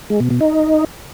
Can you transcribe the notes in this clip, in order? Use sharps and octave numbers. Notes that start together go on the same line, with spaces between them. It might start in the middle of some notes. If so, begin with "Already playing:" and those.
G#3
B2
B2
D#4